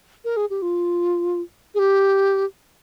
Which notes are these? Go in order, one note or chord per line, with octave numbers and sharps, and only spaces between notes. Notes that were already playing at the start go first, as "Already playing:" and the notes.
A#4
G#4
G4
F4
G#4
G4